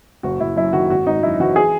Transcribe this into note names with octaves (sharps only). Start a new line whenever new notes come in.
F#1 F#4
F#1 E4
F#2 E4
D#3 F#4
G#1 F#4
G#1 D#4
F#2 E4
E3 F#4
G#4